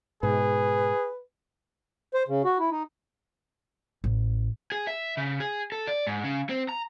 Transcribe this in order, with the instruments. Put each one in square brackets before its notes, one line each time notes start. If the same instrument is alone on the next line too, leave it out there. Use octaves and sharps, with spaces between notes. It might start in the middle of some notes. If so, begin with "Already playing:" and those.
[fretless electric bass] G#2 B2 [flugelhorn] G#4 [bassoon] B4
[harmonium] C5
C#3
F#4
E4
D#4
[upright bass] A1
[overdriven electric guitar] G#4
E5
C#3
G#4
A4
D5
G#2
C#3
C4
A#5